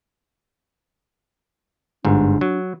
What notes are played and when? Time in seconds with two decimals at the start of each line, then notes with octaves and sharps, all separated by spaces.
2.05 G1 G#2 D4
2.41 F#3